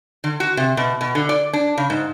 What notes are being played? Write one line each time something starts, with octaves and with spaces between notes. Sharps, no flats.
D3
F#4
C3
B2
B2
D3
D5
D4
C#3
G#2